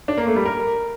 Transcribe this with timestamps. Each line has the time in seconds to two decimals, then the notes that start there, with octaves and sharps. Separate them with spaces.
0.08 D4
0.18 A#3
0.27 A3
0.36 G3
0.46 A#4